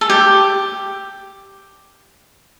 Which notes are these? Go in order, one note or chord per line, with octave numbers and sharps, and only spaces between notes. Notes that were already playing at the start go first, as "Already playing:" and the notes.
A4
G4